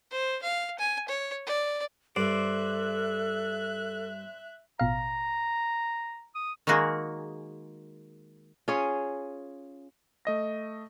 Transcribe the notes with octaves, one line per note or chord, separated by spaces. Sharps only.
C5
F5
G#5
C#5
D5
G2 A4 C5 D5 E5 F#6
A1 B2 F5 A#5
D#6
D#3 G#3 A#3 F#4 G#4
C#4 F4 G#4 C#5
A3 D#5 A#6